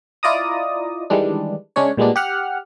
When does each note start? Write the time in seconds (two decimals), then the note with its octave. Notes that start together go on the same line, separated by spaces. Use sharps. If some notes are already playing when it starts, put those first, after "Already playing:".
0.23 E4 F4 D5 D#5 A#5 D#6
1.10 D#3 E3 G3 G#3 D4
1.76 C#3 G#3 C#4 D4 C#5
1.97 A#2 G3 G#3 B3 D4
2.16 G4 F#5 F6